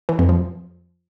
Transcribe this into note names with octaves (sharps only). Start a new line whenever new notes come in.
E3
F2
F3